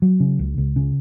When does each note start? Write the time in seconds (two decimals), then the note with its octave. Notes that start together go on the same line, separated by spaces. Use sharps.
0.02 F#3
0.20 C#3
0.39 C#2
0.58 C#2
0.76 C#3